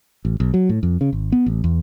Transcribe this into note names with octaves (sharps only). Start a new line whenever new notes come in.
A1
B1
F#3
A2
F2
C#3
G#1
B3
A1
E2